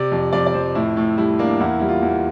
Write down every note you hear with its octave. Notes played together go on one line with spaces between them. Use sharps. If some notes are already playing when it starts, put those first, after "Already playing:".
Already playing: C3 D5
F2
F2 D5
D5
F2 C5
A2 E4
A2
G3 E4
A#3 D4
E2 E4
G3 E4
F4
E2